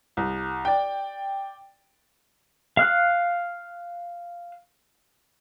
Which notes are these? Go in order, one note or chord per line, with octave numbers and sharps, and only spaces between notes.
C2
D5 G5
F5 F6 F#6